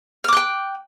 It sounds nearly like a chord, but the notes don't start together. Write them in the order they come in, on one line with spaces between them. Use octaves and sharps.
F6 D6 F#6 G5